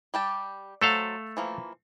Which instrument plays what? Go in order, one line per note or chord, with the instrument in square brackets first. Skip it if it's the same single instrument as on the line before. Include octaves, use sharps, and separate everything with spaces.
[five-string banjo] G3 G4 A5
[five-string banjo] F#3 C5 F#5 [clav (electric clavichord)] A3 A4 F5
[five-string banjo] E3 F3 A#3